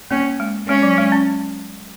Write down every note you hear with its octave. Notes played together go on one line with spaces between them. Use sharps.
A#3 C#4
G#3
G#3 C#4
F#3
G#3
C#4